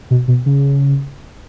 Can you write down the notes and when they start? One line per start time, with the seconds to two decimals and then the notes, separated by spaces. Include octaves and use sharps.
0.11 B2
0.28 B2
0.46 C#3